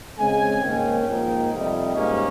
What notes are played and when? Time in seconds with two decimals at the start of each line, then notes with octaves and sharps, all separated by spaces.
0.19 C#3 G#3 C4 G#5
0.63 G#2 D#3 A#3 C#4 G5
1.07 G#2 F3 A#3 D#4
1.51 F2 C3 G3 D#5
1.96 G#2 G3 A#3 C#4